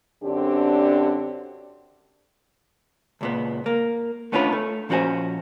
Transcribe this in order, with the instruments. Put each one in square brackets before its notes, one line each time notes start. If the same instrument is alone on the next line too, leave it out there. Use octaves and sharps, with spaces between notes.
[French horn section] F#2 D3 C4 D4 G4
[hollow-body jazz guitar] C#2 A#2 B3
A#3
A3 B3 C#4 D4 F4 B4
A3
A#2 F3 C#4 F#4 C5 G#5